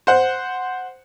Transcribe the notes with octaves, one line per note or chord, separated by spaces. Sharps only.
C5 F#5